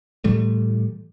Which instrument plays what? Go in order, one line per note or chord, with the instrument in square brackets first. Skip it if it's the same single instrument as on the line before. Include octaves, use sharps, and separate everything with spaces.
[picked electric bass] A2 E3 G3 A3